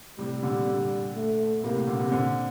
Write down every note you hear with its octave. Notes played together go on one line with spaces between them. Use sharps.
A2 C3 G3
A#2 D3
A#2 D3
A3
A2 C3 A#3
A2
A#2 D3
A2 C3
A#2 D3 C4